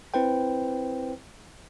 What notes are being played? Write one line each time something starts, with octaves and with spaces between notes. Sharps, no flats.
C4 E4 B4 C5 G5